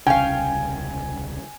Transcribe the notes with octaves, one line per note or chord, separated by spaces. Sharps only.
D#1 C2 C#3 C#4 F5 G5 G#5